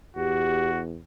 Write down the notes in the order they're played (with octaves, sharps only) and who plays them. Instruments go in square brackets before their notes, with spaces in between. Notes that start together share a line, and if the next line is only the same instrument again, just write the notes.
[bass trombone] E2 [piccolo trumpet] F#4 [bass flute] G4